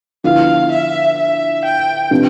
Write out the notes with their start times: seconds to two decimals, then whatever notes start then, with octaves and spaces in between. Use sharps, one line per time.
0.24 D3 F3 B3 E4 F5
0.71 E5
1.18 E5
1.64 G5
2.11 C3 F3 B3 D4